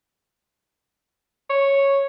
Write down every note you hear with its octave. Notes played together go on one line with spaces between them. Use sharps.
C#5